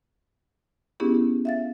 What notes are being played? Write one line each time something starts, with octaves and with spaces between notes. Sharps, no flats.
B3 C#4 D4 E4 G4 G#4
E5 F5 A6